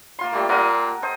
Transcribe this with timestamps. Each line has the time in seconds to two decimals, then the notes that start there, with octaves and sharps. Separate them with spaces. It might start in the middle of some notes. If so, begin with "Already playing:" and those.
0.19 A#3 F4 C6
0.33 A#2 G3 A3
0.49 A#2 A#4 D#5 F#5
1.02 A4 C5 D#5